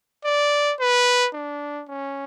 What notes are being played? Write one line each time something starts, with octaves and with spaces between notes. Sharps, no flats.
D5
B4
D4
C#4